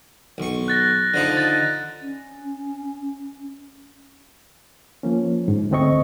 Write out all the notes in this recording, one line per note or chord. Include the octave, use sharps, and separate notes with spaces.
B1 C#6
F#6 A6 A#6
D3 F3 D#4
A6
C#4
F3 A#3 C#4
G#2
D2 A3 C4 D#5 C#6